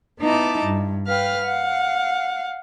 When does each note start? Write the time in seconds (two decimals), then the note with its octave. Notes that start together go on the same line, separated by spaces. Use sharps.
0.21 B3 D#4 E4 A5 D6
0.64 G2
1.07 B4 F5 G5 F6
1.44 F5 F#5